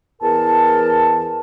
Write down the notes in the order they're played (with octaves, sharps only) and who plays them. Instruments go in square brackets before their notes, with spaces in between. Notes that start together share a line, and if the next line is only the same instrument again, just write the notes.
[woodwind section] E2 A#4 A5